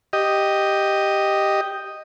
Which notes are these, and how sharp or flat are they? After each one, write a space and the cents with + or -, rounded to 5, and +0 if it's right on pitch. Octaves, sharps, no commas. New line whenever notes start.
G4 +0 D#5 +0